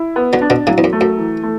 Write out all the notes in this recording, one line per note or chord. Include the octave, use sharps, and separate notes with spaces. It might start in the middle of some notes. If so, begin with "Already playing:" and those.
Already playing: E4
B3
D3 F#3
D4
B2 D3
A2 C#3 F#3
E2
F#2
A3
F#2
E3
A3